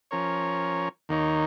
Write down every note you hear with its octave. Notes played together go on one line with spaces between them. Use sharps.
F3 C#4 A#4 C#5
D#2 D#3 A#3 D#4 C#5